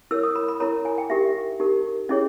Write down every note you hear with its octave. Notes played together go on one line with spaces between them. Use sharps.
E4 A#4 C#5 E6
D#6
B5
B5
E4 A#4 C#5 A#5
G#5
G5
D#4 G4 A#4 E5
D#4 G4 A#4
C#4 E4 G#4 C#5 D#5